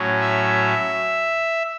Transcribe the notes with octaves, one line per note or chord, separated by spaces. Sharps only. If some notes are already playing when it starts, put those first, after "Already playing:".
Already playing: A2 F#3 C#4
E5